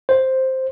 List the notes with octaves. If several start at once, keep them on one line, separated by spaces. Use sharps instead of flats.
C5